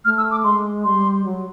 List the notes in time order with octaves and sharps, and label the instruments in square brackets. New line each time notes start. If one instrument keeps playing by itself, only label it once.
[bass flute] A3 [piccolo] F6
[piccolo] E6
D6
[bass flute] G#3 [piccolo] C6
[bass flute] G3 [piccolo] C6
[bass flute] F#3